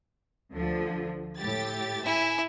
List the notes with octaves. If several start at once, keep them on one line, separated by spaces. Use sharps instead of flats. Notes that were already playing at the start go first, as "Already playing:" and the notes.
D2 D3 F3
A2 G4 A6
E4 E5 G#5